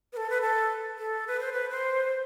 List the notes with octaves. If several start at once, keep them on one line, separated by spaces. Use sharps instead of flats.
B4
A4
B4
A4
A4
B4
C5
B4
C5